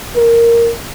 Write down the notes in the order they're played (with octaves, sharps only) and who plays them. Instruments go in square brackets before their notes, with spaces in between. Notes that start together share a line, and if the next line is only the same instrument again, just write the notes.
[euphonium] A#4